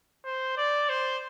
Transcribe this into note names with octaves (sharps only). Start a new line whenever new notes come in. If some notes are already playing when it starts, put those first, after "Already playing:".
C5
D5
C5